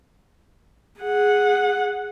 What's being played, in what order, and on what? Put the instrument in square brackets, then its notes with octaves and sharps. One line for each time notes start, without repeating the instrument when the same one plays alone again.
[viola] G#4 F#5